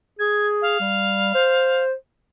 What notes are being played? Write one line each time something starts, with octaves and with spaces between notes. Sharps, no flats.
G#4 G#6
F5
G3
C5